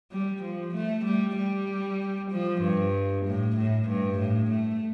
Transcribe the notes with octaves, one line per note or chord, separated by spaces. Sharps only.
G3
F3
A3
G3
G3
F3
G2
A2
A2
G2
A2
A3